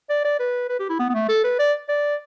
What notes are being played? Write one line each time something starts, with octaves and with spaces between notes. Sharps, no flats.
D5
D5
B4
B4
G4
E4
B3
B3
A3
A4
B4
D5
D5